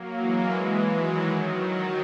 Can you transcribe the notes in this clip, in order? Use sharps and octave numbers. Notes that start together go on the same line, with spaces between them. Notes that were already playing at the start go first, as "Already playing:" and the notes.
Already playing: F#3 A#3
E3 G#3
D#3 F#3
D#3 F#3